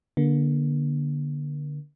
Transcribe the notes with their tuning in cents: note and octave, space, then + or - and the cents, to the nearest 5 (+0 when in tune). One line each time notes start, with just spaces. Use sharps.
D3 +0 A#3 +35